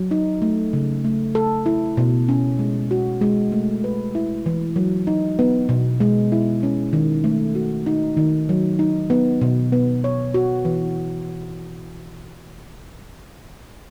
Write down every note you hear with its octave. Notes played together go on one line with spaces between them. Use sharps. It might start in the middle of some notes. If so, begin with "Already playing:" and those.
Already playing: F#3
D#4
A3
C#3
A3
A4
E4
B2
C#4
G#3
F#4
G#3
A3
B4
E4
E3
F#3
D#4
B3
B2
G#3
E4
C#4
D#3
A3
F#4
D#4
D#3
F#3
D#4
B3
B2
B3
C#5
F#4
E3